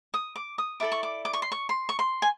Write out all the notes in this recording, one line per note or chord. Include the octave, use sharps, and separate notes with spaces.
D#6
D6
D#6
E4 A4 D5 D6
C#6
D6
D6
C#6
C6
C#6
C6
C#6
C6
G#5